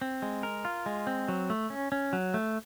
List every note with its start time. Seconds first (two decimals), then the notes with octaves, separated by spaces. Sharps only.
0.01 C4
0.22 G#3
0.43 A#4
0.65 F4
0.86 G#3
1.07 C4
1.28 F#3
1.50 A3
1.70 C#4
1.92 C#4
2.13 F#3
2.34 A3